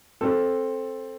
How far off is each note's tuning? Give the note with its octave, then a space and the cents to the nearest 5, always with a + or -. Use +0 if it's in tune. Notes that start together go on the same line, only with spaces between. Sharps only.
C4 +10 A4 +0